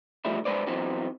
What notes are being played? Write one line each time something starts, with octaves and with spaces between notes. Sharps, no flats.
E3 F3 G3 A3 D#4 E4
C2 G#3 B4 C5 D5
E3 F#3 B3 C4 D#4